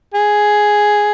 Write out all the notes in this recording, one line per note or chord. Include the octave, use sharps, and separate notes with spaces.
G#4